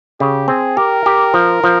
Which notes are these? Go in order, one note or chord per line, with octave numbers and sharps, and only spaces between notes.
C#3 G4
C4 G#4
G4 A#4
G4
F3
F3